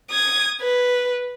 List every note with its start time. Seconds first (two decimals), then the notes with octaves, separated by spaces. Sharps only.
0.10 D#6 G#6
0.61 B4